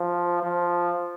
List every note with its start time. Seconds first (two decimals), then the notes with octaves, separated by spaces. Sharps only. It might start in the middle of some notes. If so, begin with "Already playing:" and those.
Already playing: F3
0.43 F3